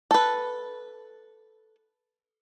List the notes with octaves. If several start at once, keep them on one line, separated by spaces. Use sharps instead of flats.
A4 B4